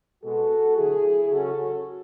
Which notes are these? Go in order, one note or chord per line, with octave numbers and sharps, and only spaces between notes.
B2 G#3 B3 F#4 A4
D3 F#3 A3 E4 G#4
C#3 F#3 C#4 F#4 A4